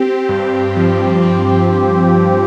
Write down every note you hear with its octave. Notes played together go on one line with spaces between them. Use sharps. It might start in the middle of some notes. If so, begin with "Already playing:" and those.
Already playing: C4 G4
G2
F3
C4